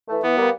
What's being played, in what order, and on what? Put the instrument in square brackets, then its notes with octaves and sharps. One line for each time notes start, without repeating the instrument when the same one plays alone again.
[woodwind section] E3 A3
[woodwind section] E3 [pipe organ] B3
[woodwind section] G3 A#3